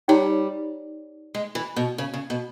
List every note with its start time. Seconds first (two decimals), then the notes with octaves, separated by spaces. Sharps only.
0.08 G3 D#4 G4 C#5 G5 A#5
1.35 G#3
1.55 E3
1.76 B2
1.98 C#3
2.14 C#3
2.30 B2